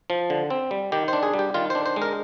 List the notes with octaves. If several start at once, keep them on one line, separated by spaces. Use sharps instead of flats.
F3
D3
C4
G3
D#3 G4
D4 C5
G#4
G3
G4
D#3 F4
D4 C5
C5
G#3
A#4